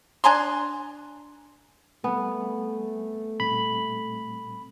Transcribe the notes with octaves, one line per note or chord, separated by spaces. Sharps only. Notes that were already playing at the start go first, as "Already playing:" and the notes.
D4 G#5 A#5 C6
G3 A3 B3 C4 G#5
A#2 G3 C4 B5